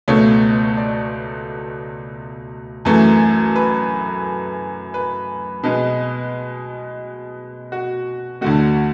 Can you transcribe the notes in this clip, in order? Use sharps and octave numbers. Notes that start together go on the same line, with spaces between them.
C#2 B2 A3 C#5
D5
F#2 E3 A3
B4
B4
B2 G#3 B3
F#4
D2 D3 A3 F#4